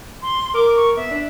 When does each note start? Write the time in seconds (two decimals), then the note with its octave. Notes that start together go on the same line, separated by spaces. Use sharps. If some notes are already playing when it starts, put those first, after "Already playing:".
0.22 C6
0.54 A#4 D6
0.76 C#6
0.96 B3 E5
1.11 D4